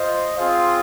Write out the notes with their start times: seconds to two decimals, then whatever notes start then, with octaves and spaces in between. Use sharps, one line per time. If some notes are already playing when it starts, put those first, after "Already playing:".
Already playing: F4 C5 D#5
0.36 C4 F4 G#4 C5 F5